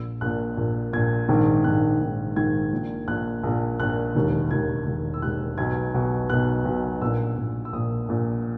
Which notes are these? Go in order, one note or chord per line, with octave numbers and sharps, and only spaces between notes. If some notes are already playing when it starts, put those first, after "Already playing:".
Already playing: A#1 A#2 E6
A#1 A#2 F#6
A#1 A#2
A#1 A#2 G#6
A#1 G#2 D#3
A#1 G#2 D#3 F#6
A#1 G#2 D#3
A#1 G#2 D#3 G#6
A#1 A#2
A#1 A#2 F#6
A#1 A#2
A#1 A#2 F#6
E1 D#2 D#3
E1 D#2 D#3 G#6
E1 D#2 D#3
E6
E1 D#2 D#3 F#6
B1 B2 G#6
B1 B2
B1 B2 F#6
B1 B2
A#1 A#2 E6
A#1 A#2
E6
A#1 A#2 D#6
A#1 A#2